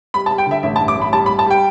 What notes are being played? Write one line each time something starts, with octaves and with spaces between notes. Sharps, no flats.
G3 B5
A5
G3
G5
D3 E5
A1 E5
A5
G2
D6
A1
B5
G3 A5
B5
G3
A5
G3 G5